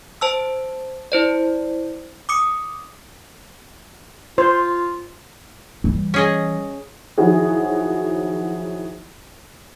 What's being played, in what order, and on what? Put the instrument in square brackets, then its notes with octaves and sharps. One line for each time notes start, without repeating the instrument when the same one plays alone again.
[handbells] C5 A5 E6
E4 C5 D5
D6 D#6 C#7
[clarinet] F4 [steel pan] C5
[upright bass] E3 G3
[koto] C#4 G#4 D#5
[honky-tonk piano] D#3 F3 F#3 E4 F#4 G#4